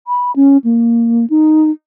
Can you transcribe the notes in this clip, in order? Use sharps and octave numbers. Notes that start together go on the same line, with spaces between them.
B5
C#4
A#3
D#4